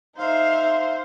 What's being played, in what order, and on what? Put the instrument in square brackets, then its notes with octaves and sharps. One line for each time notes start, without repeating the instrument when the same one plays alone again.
[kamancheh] D#4 E5 [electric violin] C5 [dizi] F5